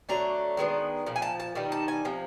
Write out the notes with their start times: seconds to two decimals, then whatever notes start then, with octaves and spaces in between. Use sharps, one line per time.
0.09 D3 F#3 A3 D4 A#5
0.57 D#3 G#3 B3 D4
1.07 A#2 F3
1.16 G#5
1.22 A5
1.40 A5
1.55 D#3 G3 B3 D#4
1.72 A5
1.88 G#5
2.05 C3 F3